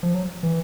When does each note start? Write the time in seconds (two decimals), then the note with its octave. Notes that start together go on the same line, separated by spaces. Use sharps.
0.03 F3
0.15 F#3
0.43 E3